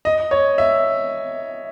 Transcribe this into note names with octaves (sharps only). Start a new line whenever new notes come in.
D#5
C#5
E5